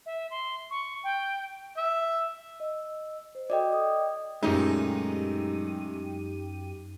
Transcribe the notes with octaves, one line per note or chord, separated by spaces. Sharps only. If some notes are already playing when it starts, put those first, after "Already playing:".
E5
C6
C#6
G5
E5
D#5 E6
C5
F#4 A4 D5 D#5 G5
D#6
F#2 A#2 G#3 A3 C#4 D#4 G4 D#7